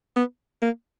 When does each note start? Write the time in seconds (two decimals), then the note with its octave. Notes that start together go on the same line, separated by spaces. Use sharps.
0.16 B3
0.62 A#3